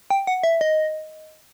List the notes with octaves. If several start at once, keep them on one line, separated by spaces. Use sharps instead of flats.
G5
F#5
E5
D#5